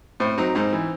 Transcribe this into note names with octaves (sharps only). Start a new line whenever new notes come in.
A2 C4
F#3 C4 D#4
G#2 C4 D#4
E3